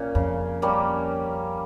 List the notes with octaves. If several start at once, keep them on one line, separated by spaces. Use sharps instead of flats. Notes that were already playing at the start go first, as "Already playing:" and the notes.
Already playing: A#2 C#4
F2 C#3
G3 A#3 C#4